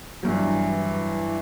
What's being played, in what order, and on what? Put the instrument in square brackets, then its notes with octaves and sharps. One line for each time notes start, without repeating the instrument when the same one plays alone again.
[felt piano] G2 F#3 [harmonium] E3